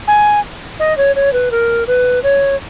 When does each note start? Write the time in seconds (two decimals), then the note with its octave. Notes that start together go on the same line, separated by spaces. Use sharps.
0.08 G#5
0.80 D#5
0.97 C#5
1.16 C#5
1.33 B4
1.51 A#4
1.87 B4
2.23 C#5